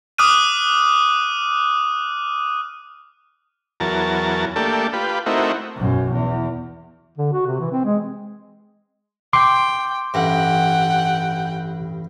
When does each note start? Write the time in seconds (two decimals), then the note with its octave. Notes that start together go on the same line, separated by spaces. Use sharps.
0.18 D6 D#6 F6 F#6 D#7
3.80 E2 F#3 A#4 A5
4.56 A3 A#3 D4 G4 A4
4.93 F4 G4 B4
5.26 A3 C4 D#4 E4 F#4 A#4
5.77 B1 F#2
6.12 E2
7.18 D3
7.33 F#4
7.46 C3
7.60 E3
7.72 C4
7.85 G#3
9.33 G5 C6 D6
10.14 A1 G2 F#5 G5